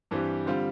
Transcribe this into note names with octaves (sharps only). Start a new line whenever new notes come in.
G2 E3 G3 C4 G4
D3 G3 C4 F4